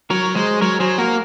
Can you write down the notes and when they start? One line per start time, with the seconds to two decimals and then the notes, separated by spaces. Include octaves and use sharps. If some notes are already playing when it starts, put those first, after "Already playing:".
0.10 F#3 A#4 C#5
0.35 G#3 C5 D#5
0.61 F#3 A#4 C#5
0.80 F#3 G#4 C5
0.98 A#3 F#4 A#4